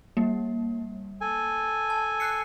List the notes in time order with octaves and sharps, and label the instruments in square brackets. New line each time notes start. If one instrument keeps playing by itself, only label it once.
[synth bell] G3 A#3
[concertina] A4 G#5
[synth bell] A5
F#6 C7 C#7